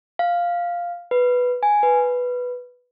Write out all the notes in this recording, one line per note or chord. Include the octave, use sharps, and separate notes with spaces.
F5
B4
G#5
B4